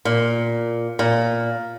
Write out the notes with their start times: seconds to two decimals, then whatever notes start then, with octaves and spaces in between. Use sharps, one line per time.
0.05 A#2
0.99 A#2